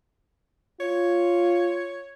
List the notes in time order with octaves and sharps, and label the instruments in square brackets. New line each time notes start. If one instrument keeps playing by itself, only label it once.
[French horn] F4 [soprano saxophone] C#5